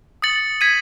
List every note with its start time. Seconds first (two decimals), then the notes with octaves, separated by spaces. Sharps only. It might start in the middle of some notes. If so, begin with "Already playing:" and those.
0.22 D#6 A6 C#7 F#7
0.61 G#6 B6 D#7